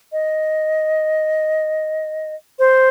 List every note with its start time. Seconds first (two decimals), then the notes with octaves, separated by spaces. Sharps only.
0.12 D#5
2.59 C5